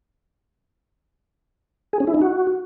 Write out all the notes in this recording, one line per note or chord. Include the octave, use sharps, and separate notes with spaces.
G#4
C#4
E4
D#4
F#4